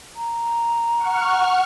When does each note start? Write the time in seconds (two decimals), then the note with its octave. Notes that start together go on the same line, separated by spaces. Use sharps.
0.16 A#5
0.97 F#5 C#6 F6